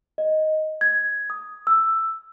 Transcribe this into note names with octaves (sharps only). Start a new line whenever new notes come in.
D#5
G#6
D#6
E6